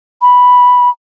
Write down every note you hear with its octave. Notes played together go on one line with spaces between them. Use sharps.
B5